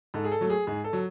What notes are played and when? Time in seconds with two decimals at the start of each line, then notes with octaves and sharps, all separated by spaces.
0.14 G#2 A4
0.24 G#4
0.32 A4
0.41 F#3 A3
0.50 G#4
0.67 G#2 G#4
0.84 A4
0.93 F#3